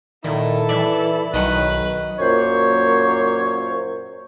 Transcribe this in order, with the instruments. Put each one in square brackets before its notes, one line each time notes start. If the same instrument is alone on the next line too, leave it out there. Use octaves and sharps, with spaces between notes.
[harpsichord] A#2 [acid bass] D#3 [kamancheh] E4 A4
[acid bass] E3 [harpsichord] D5 E5
[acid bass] B1 [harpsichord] D#3 F#3 F#5 [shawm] B4
[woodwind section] F#2 A#2 A#3 C5 C#5